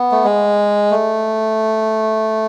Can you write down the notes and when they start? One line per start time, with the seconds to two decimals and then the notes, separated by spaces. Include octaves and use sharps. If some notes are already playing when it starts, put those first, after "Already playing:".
Already playing: B3
0.12 A3
0.24 G#3
0.91 A3